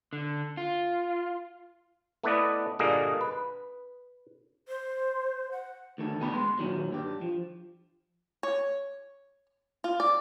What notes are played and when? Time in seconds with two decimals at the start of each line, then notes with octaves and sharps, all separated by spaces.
0.13 D3
0.57 F4
2.24 A3 B3 E4 B4 D5 D#5
2.79 G2 A#2 D3 A#3 G#4 D#5
3.21 B4
4.68 C5
5.52 F#5
5.98 D2 D#3 A4
6.20 D2 B3 G5 B5
6.33 G#3 C6
6.59 A#2 D#3 F#3
6.92 G2 G4
7.21 F3
8.43 C#5
9.84 F4
10.00 D5